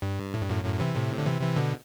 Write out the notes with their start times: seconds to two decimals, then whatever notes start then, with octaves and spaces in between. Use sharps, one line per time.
0.02 G2
0.34 A2
0.42 G2
0.49 F#2 A2
0.64 F#2 A2
0.80 C3 E3
0.95 A2 C3
1.18 D3
1.26 C3 E3
1.41 C3 E3
1.56 B2 D3